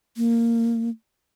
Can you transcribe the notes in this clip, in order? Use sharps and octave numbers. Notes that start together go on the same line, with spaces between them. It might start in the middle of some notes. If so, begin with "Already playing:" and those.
A#3